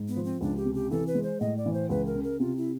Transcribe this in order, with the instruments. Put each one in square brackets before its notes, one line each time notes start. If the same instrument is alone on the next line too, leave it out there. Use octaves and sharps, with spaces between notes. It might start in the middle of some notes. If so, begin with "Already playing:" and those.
Already playing: [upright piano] G#2
[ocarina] B3
[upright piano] F3
[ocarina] C4
[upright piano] C#2 [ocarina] D4
[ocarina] G4
[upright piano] C3
[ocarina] G4
[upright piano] E3 [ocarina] A4
[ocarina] B4
[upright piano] G#3
[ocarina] C5
[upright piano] A2 [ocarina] D#5
[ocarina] D5
[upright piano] E3
[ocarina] C5
[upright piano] C#2 [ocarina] B4
[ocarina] A#4
[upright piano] C#3
[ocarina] A#4
[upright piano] C3 [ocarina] F4
[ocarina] E4